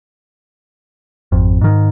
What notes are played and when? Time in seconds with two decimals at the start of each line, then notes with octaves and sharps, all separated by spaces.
1.32 G#1 F2
1.61 G#2 D#3